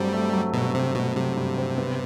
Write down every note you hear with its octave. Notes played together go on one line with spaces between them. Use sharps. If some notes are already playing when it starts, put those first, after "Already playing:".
Already playing: G2 F#3 G3 A3 C4
A3
F#3
G2 B2
C3 C4
B2 A3
C3 F#3
G2
C4
B3